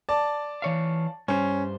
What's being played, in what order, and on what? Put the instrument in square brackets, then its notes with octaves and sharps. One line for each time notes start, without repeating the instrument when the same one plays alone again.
[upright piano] D5 A5
[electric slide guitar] E3 C#5 F5
[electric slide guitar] G2 G3 C5 [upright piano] C#4